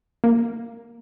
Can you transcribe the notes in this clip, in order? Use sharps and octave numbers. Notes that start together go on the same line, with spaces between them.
A#3